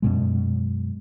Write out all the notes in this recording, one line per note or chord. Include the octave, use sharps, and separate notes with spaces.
F#2 B2 G#3